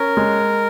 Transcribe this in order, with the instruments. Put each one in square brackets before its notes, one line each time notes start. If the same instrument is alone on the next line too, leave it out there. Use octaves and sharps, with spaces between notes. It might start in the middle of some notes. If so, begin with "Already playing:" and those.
Already playing: [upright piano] C#4 [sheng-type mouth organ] A#4
[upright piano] G#3